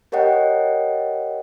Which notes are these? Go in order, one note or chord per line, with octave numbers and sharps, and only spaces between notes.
G4 A#4 C#5 D#5 F#5 G5